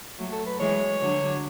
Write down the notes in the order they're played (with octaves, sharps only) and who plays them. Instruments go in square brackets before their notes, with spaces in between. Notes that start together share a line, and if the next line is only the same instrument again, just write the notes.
[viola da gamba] F#3 A3
[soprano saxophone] A4
B4
[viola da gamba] E3 G#3 [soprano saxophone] C#5
[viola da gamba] D3 F#3